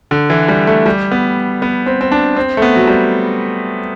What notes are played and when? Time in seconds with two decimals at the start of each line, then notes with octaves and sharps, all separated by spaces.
0.11 D3
0.30 E3
0.48 G3
0.67 A3
0.86 G3
1.11 B3
1.62 B3
1.86 C4
2.01 C4
2.12 D4
2.36 C4
2.57 A3
2.62 B3
2.75 F#3
2.87 G3